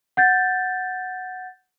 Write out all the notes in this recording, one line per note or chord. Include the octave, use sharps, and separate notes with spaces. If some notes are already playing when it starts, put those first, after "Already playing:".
F#5 G6 A6